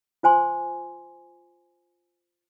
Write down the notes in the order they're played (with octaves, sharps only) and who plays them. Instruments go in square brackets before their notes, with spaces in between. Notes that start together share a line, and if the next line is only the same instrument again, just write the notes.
[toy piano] F4 C5 G#5 C6